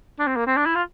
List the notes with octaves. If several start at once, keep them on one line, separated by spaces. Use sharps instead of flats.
D4
C4
A#3
C4
D4
E4
F4